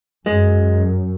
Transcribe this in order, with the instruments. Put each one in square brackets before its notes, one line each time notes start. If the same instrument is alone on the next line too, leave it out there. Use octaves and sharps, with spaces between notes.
[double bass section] F#2 [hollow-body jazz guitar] G#3